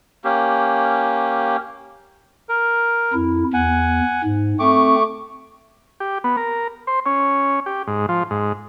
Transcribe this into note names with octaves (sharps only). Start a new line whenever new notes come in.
A#3 C#4 G4
A#4
F2 E4
E2 F#5 G#5
G#2
A3 C4 C#6 D6
G4
B3
A#4
C5
C#4
G4
G#2
F3
G#2